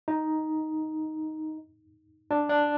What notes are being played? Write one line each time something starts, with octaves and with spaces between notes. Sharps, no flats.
D#4
D4
D4